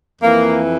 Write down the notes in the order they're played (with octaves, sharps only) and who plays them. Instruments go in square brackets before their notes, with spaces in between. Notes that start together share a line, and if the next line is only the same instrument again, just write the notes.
[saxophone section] F2 E3 A#3